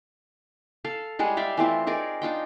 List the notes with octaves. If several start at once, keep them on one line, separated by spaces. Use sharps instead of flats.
A4 F5
G3 G#3 G#4 F#5
D5 E5 F5 G5
E3 A3 C4 F4
D#4 G#4 A#4 D5
D4 D#4 F4 G5